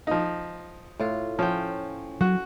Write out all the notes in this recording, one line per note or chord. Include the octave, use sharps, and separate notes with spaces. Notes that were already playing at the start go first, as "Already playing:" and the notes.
F3 D#4
A2 F4
F3 C#4 G5
F#3 F#4